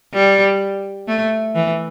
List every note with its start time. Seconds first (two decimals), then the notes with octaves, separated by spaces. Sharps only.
0.13 G3
1.08 A3
1.55 E3